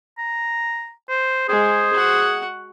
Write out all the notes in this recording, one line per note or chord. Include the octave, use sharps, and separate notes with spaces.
A#5
C5
G#3 G#4 C5
F#4 F#5